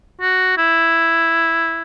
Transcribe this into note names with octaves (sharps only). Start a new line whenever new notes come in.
F#4
E4